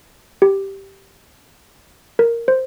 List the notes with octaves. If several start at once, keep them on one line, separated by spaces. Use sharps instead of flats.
G4
A#4
C5